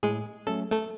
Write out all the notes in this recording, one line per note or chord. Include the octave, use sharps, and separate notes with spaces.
A2 G#3 G#4
F#3 A3 C#4 A4
A3 A4